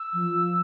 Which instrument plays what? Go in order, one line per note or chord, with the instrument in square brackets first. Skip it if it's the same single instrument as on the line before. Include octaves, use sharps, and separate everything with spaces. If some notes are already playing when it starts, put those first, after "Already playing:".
Already playing: [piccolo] E6
[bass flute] F3